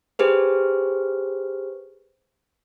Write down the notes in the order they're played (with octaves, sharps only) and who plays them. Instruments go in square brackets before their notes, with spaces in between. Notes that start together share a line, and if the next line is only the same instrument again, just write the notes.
[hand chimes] G4 G#4 B4 C5